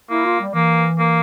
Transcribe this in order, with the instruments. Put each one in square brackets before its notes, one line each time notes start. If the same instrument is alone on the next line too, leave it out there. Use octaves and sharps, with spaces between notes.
[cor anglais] A#3 [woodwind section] E4
[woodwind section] F4
G3
[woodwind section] E3 [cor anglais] A#3
[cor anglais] A#3